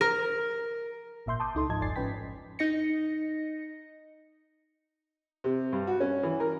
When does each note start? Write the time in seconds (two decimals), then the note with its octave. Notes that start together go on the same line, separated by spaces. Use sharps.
0.01 A#4
1.26 G#1 A#2 E5 C6 G6
1.40 A5 C6 D6 D#6 G6
1.55 C#2 D#4 A4 C6
1.70 G#2 F3 D#5 A5 G#6
1.81 G#1 F2 D5 G#5 A6 C7
1.96 G#2 F3 C#4 B4 G5 B6
2.59 D#4 D#5 A#6 C#7
5.44 C3
5.72 G2
5.87 F#4
6.00 C#4
6.23 E3
6.40 A#4